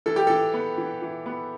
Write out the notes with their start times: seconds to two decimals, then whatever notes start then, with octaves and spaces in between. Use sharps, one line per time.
0.06 E3 A4
0.16 G4
0.27 E3 A4
0.54 B3
0.78 E3
1.02 E3
1.26 B3